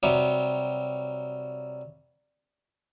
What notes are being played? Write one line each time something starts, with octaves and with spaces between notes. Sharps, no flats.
C3 F#3 G3